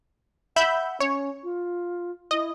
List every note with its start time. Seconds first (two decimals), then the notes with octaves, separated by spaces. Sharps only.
0.56 E5 F#5 B5 G6
1.00 C#4 C#5
1.43 F4
2.31 E4 D#5